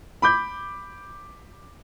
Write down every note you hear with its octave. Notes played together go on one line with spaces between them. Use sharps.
B5 D6 G6